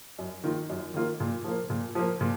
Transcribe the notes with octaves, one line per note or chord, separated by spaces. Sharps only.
F#2
D#3 A#3 F4
F#2
D#3 A#3 F4
A#2
F3 A#3
A#2
F3 A#3
A#2